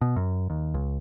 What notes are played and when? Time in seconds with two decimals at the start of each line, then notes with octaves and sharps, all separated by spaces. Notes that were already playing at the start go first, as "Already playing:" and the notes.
0.01 B2
0.16 F#2
0.50 D#2
0.74 C#2